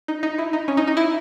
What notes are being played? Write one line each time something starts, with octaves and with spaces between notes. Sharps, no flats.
D#4
D#4
E4
D#4
C#4
D#4
D#4
E4